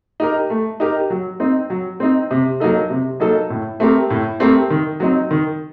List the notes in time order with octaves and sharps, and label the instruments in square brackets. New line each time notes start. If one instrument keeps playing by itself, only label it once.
[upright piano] D#4 G4 A#4
A3
D#4 G4 A#4
F#3
C4 D#4
F#3
C4 D#4
C3
F#3 A#3 D#4 A4
C3
F#3 A#3 D#4 A4
A2
A3 C4 G4 A#4
A2
A3 C4 G4 A#4
D#3
F#3 C4 D#4
D#3